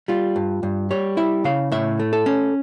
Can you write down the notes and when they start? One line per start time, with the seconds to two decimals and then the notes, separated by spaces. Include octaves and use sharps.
0.08 G3 F4
0.36 G2
0.63 G2
0.91 G3 C#5
1.17 E4 E5
1.44 C#3 F5
1.72 A2 E5
2.00 A3
2.13 A4
2.26 C#4